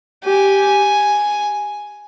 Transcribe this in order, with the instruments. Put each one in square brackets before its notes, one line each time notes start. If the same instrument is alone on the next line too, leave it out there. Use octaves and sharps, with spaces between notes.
[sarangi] G4 [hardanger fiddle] G#5